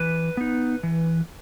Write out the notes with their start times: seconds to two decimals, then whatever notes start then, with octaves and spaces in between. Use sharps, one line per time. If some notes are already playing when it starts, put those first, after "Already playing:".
Already playing: E3 B4
0.37 B3 D#4
0.83 E3